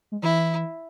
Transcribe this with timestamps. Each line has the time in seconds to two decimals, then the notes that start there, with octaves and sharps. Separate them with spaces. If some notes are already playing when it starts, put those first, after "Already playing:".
0.12 G#3
0.23 E3 E4